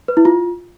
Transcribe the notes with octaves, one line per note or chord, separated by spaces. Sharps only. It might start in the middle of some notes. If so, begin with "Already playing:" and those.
B4
E4
F4